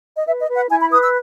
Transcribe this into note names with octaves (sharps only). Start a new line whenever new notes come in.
D#5
B4 E5
D#5
B4
F#5
E4 G#5
B5
B4 D#6
E6